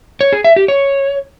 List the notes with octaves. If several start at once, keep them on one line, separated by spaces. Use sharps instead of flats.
C#5
G#4
E5
G4
C#5